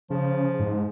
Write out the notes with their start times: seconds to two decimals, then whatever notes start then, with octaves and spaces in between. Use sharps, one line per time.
0.10 C#3 F3
0.59 G#2